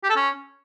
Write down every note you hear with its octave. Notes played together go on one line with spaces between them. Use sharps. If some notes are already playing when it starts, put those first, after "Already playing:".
G4
A4
C#4